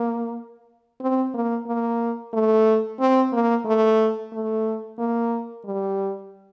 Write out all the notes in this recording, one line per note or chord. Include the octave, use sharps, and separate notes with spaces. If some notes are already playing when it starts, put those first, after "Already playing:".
Already playing: A#3
C4
A#3
A#3
A3
C4
A#3
A3
A3
A#3
G3